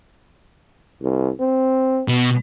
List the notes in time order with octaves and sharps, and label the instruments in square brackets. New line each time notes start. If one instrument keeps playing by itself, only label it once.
[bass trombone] C2
C4
[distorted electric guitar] B2